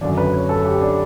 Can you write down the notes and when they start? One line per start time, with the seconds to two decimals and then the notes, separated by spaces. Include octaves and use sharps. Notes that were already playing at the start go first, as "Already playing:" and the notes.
0.01 F#2 D3 F#3 D4
0.18 B4
0.33 C#5
0.49 A4
0.65 G4
0.81 D4